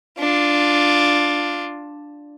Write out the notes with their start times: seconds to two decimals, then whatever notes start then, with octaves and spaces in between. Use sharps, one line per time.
0.19 D4 F4